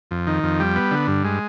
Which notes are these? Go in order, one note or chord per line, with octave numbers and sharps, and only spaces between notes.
F2
D#3
F2
G3
B3
D3
G2
G#3